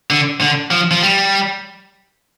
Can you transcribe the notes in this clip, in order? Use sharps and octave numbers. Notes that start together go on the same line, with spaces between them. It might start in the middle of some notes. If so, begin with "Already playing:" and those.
D3
D3
F3
F3
G3